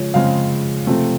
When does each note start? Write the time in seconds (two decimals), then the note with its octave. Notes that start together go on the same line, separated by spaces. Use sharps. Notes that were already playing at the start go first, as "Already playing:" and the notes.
Already playing: C#3 F3 G#3 C#5
0.14 C#3 F3 G#3 C4 F5
0.87 C3 F3 A3 C4